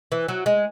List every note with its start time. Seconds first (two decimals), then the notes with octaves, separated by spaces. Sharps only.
0.12 E3
0.28 F#3
0.46 G#3